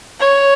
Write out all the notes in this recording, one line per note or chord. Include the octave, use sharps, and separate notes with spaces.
C#5